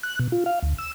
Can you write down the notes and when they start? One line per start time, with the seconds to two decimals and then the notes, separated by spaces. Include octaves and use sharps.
0.03 F#6
0.19 B2
0.32 F4
0.46 F5
0.63 D2
0.78 E6